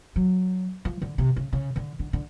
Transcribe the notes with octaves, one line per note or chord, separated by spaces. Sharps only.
F#3
F3
D3
C3
C#3
C#3
D3
D3
D3